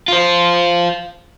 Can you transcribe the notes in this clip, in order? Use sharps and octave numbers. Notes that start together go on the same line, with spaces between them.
F4 C5